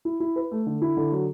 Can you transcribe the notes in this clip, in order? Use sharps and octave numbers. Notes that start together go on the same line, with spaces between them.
E4
E4
B4
A3
D3
E4
D3
F#3